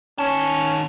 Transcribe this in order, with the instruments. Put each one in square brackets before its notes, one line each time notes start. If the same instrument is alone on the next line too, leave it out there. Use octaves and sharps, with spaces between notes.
[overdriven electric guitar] D#3 A5 [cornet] C#4